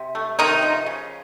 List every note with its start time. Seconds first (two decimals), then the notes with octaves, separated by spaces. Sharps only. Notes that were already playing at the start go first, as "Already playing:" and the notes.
Already playing: C3
0.15 A3
0.39 C3 D#3 D#4
0.62 F3
0.86 C#3